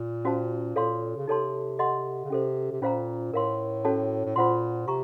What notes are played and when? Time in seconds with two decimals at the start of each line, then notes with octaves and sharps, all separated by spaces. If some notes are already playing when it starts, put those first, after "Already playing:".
Already playing: A#2
0.25 C#4 F#4 C5 F5 A5
0.76 A#2 A4 C#5 F5 C6
1.16 C#3
1.27 C3 D#4 A4 C#5 A5 C6
1.79 A4 D#5 F#5 C6
2.25 C#3
2.30 C3 C#4 A4 C5
2.72 C3
2.81 A#2 C#4 F4 C5 F5 A#5
3.33 A2 A#4 F5 C6
3.85 C#4 F#4 A4 C#5 A5
4.26 A2
4.36 A#2 F4 C5 F#5 C6
4.87 C3 A#5 C#6